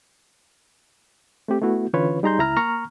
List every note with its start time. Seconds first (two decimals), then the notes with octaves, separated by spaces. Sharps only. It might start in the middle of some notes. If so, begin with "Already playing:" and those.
1.48 A3 C4 G4
1.62 A3 B3 E4 F#4
1.93 D3 E3 C#4 F4 B4 C#5
2.23 G3 D#4 G#4 A#5 C6 G6
2.39 C#2 E4 A#5 F6
2.57 A#3 A#5 C#6 F6